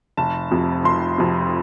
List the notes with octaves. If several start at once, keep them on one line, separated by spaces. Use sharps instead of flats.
F1 A5
F2 C3
F1 C6
F2 C3